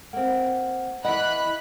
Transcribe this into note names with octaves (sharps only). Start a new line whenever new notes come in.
A#3 C4 F#5
E3 B4 D#5 F#5 B5 F#6